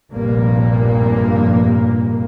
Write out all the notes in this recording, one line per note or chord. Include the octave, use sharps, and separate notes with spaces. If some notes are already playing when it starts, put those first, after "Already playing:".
F1 A#1 G2 A#2 A#3